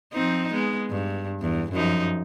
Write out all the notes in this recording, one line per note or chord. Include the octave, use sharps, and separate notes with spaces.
F3 C4 D#4
G#3 B3
G2
E2
F#2 F3 D#4